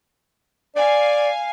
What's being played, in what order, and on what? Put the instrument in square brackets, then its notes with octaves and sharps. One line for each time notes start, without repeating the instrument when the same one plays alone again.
[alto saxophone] D5 [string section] F5 G#5